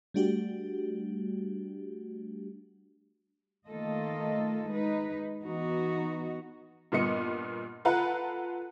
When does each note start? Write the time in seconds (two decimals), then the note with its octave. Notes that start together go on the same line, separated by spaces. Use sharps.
0.14 G3 A3 D4 F#4 G4
3.68 D#3 A3 A#3 F4 A4 D#5
4.68 G#3 D#4 B4
5.43 E3 B3 D#4 F#4
6.92 G2 A#2 B3 D#5 C#7
7.85 F4 A4 B4 F#5 A#5